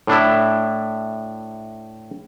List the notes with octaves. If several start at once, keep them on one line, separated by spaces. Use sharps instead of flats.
A2 D4 E4